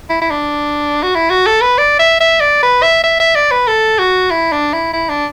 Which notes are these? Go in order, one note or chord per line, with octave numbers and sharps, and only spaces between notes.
E4
E4
D4
F#4
E4
F#4
A4
B4
D5
E5
E5
D5
B4
E5
E5
E5
D5
B4
A4
F#4
E4
D4
E4
E4
D4